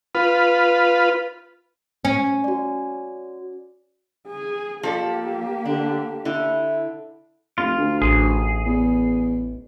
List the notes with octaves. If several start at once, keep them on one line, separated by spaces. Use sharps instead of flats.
F4 B4
C#4
F#4 D5
G#4
F3 A#3 G4 A4 D5
D3 D4
D3 E4
F1 F4
D2
A1 G#4
E2